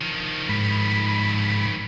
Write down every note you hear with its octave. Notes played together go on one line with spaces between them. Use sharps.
D#3 F3
G#2 B5